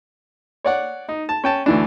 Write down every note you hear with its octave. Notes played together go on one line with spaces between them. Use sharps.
C#5 D5 F#5
D#4
A5
C#4 G5 A5
D2 E3 D4